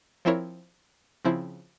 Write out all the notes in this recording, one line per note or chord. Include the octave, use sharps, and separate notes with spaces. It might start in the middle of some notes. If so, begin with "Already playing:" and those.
F3 C4 E4 A#4 C#5
C#3 F3 C4 E4